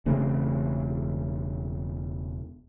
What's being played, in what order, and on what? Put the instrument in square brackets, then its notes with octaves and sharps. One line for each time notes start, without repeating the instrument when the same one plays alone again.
[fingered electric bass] E1 C#3 A3 C4